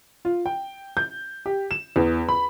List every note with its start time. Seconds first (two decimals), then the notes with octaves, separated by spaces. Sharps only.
0.25 F4
0.46 G5
0.97 G6
1.46 G4
1.71 E7
1.96 E2
2.29 B5